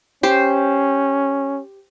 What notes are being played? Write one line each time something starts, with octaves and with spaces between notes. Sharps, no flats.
C#4 G4 C5